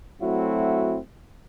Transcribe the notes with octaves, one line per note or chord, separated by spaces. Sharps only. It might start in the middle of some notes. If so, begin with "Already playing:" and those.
F#3 A3 C4 E4 F#4